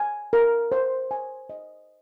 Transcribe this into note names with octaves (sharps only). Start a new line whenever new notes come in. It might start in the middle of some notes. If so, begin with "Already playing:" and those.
Already playing: G#5
A#4
C5
G#5
D#5